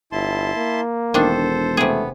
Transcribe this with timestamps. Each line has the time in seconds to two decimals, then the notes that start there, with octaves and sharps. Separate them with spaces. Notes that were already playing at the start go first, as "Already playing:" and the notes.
0.12 G1 E4 A5 C6
0.56 A#3
1.14 E1 D#3 D4 A4 C5
1.77 C3 A3 B3 G#4